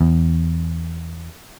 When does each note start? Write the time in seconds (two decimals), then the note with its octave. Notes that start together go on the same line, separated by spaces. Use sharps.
0.01 E2